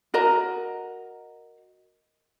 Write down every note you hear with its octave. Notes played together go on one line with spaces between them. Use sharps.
F#4 A#4 D#5 A#5